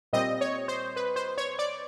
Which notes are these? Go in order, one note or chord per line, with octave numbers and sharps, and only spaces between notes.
A#2 G3 C4 D#5
C#5
C5
B4
C5
C#5
D5